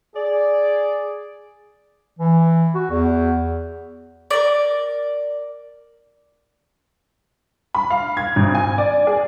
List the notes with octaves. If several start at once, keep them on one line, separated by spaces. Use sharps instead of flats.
G#4 D5
E3
F#4
E2
A#4 D5
B5
F5
G#6
G#1
G#5
D5
G#4